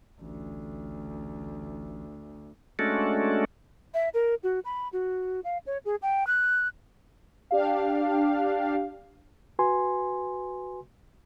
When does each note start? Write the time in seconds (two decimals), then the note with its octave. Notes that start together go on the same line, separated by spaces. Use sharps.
0.21 A1 D2
2.79 G#3 A3 C#4 D4 F#4 A4
3.94 E5
4.14 A#4
4.43 F#4
4.65 B5
4.93 F#4
5.44 F5
5.66 C#5
5.85 G#4
6.02 G5
6.27 F#6
7.51 D4 G4 F5
9.59 F#4 B4 G#5 C6